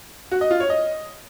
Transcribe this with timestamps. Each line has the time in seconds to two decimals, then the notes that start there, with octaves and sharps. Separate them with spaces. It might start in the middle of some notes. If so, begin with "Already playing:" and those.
0.31 F#4
0.41 D#5
0.51 F4
0.60 C#5
0.70 D#5